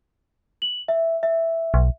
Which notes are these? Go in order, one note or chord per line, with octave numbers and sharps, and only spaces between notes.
F#7
E5
E5
B1